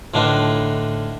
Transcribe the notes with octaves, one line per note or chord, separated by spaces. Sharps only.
A2 D3 D4 D#4 F4 B4